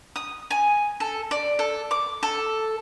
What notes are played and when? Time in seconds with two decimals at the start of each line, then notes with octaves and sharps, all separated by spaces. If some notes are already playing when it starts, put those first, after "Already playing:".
0.16 D#6
0.50 G#5
1.00 A4
1.31 D5
1.59 A4
1.91 D6
2.23 A4